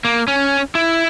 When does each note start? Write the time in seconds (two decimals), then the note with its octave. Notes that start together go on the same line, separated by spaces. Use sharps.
0.05 A#3
0.28 C#4
0.75 E4